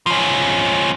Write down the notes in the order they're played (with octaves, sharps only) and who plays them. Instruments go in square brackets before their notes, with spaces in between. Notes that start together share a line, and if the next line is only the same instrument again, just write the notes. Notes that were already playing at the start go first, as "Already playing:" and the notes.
[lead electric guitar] F3 C#4